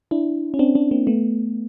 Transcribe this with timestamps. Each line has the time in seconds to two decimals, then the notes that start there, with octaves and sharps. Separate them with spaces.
0.11 D4 E4
0.54 C#4
0.59 C4 D4
0.75 C4 D4
0.91 A#3 C4
1.07 A3 B3